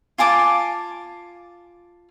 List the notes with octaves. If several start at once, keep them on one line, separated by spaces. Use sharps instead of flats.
F4 G#5 A5 D6